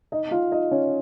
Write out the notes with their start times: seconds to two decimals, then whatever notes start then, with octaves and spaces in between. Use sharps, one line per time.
0.12 D#4 D#5
0.31 F4 F5
0.52 D#4 D#5
0.71 C#4 C#5